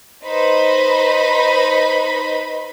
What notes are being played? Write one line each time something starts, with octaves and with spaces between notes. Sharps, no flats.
D#4 B4 C5 B5